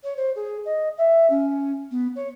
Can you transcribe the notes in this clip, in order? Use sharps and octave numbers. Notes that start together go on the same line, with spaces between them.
C#5
C5
G#4
D#5
E5
C#4
B3
C#5